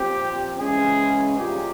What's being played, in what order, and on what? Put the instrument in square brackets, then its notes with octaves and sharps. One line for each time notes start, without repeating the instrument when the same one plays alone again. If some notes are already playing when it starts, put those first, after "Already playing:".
Already playing: [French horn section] A#2 F3 C4 [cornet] G4
[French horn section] C#3 E3 G#3 C#4 [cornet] G#4
[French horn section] C3 G3 A#3 F4 G#4 [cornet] G4